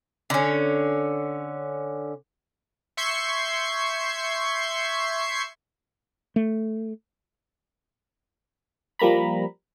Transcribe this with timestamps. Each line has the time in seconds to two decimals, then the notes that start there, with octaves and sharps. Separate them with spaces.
0.30 D3 C#4
2.97 E5 C6 C#6 G6 G#6 C7
6.36 A3
8.99 F3 G3 A#3 A#5 B5